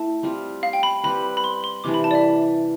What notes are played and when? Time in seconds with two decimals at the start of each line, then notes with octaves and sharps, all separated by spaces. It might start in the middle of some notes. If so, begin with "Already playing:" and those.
Already playing: A3 E4 A5
0.23 G3 C4 F4
0.63 F5
0.73 G5
0.83 B5
1.03 G3 C4 G4 B4 B5
1.37 B5
1.44 C6
1.64 C6
1.84 C3 E3 G3 D4 D6
1.94 B5
2.04 A5
2.11 D5
2.15 E5